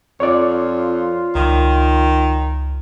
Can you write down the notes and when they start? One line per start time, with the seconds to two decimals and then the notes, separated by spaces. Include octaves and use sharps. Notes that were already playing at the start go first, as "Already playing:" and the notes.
0.20 F2 F4 C#5 D5
1.35 C#2 D#3